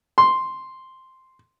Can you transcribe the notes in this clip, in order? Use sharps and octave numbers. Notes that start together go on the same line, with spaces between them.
C6